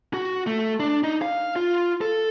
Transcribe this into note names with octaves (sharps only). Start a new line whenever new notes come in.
F#4
A3
D4
D#4
F5
F4
A4